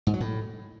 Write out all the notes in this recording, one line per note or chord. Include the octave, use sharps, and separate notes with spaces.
G#2
F#3
A2